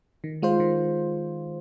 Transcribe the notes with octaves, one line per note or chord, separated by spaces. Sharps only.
D#3
G#3 F4 C5
D#3